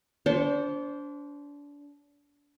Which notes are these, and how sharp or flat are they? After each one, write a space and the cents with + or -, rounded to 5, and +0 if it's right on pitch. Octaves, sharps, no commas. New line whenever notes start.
D4 -30 C5 +0 C#6 +0